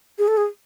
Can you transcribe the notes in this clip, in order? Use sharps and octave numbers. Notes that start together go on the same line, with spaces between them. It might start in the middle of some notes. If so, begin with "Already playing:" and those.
G#4
A4
G#4